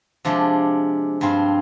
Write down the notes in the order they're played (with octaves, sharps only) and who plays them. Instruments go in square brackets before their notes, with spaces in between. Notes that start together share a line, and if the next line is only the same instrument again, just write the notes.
[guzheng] C3 F3 G#3 D4
G2 F3 C4 F4